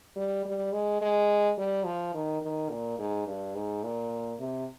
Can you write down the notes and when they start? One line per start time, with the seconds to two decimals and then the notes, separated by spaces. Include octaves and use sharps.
0.16 G3
0.45 G3
0.73 G#3
1.01 G#3
1.58 G3
1.85 F3
2.14 D#3
2.42 D#3
2.70 A#2
2.99 G#2
3.27 G2
3.55 G#2
3.84 A#2
4.40 C3